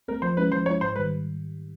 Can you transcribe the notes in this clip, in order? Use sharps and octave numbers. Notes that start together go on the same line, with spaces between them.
A3 C4 A#4
F3 C5
G#3 C#4 E4 B4
F3 C5
G#3 C#4 E4 C#5
G#2 C5
D#3 G3 B4